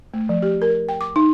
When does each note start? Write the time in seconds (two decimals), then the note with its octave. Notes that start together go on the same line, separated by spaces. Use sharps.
0.14 A3
0.29 F3
0.42 G4
0.62 A#4
0.89 G5
1.01 D6
1.16 D#4